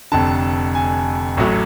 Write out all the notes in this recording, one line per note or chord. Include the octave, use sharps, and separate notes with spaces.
F1 F2 D3 A5
G#5
A1 A2 F#3 A3